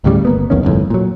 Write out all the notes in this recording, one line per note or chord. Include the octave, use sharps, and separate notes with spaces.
D2 A2 C#3 G3
G1 A#3 B3
B1 E2 D#3 C#4
G1 C2 F2 A2
A#2 F#3